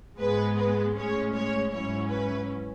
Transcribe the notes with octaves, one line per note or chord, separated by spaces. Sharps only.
G#2 G#3 B3 B4
B4
A2 G#3 C#4 C#5
C#5
G#2 F#3 C#4 E4 C#5
B4